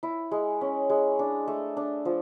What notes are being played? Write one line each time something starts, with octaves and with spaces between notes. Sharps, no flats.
E4
G#3
C#4
G#3
D4
A3
D4
F3